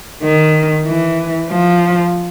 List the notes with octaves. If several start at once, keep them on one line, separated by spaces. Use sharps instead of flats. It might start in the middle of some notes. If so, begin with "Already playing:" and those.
D#3
E3
F3